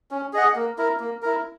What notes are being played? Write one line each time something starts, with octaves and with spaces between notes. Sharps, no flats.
C#4
G#4 D#5 F#5
A#3
E4 A#4
A#3
E4 A#4